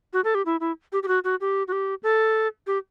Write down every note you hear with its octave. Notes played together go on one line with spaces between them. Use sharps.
F#4
A4
G4
E4
E4
G4
G4
F#4
F#4
G4
F#4
G4
A4
G4